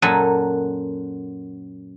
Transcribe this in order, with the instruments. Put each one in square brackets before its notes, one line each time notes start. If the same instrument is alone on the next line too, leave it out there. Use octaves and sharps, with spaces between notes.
[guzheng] F#2 A#2 F#3 A4 F#5 G#5